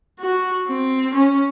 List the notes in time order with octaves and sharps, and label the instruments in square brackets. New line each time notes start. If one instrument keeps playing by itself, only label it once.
[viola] F#4
C4
C#4